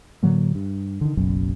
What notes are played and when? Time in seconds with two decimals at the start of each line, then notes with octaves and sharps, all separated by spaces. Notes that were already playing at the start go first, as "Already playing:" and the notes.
0.23 A2 D3 F#3 A#3
0.55 G2
1.01 D3 D#3
1.17 F#1 B1 F#2